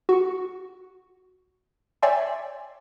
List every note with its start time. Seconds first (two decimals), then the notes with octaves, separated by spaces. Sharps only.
0.09 F#4 C#6
2.02 C#5 D5 E5 G5 G#5 C6